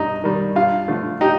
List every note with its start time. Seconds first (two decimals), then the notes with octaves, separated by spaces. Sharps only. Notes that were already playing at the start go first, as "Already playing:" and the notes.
Already playing: G2 D#4
0.24 D#3 G3
0.55 G2 F4
0.88 D3 F3 A3
1.21 D#4 G4